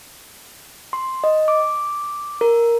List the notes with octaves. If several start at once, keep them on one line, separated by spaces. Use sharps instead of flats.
C6
D#5
D6
A#4